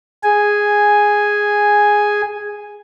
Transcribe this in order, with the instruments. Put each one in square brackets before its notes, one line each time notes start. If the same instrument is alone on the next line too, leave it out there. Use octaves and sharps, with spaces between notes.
[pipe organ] G#4 G#5